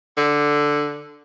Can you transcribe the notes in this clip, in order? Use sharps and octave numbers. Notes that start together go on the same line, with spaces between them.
D3